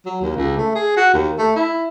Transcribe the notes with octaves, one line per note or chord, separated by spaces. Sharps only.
F#3
D#2
C#2
A3
G#4
F#4
D#2
A3
E4